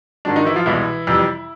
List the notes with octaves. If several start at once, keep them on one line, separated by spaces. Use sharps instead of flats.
G#2 D#3 G#3 D4
D#3 D#4
E3 E4
F3 F4
C2 B2 E3 G#3 E4
F2 C3 E3 G3